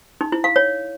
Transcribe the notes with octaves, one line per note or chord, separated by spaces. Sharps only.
D#4
E4
F5
C#5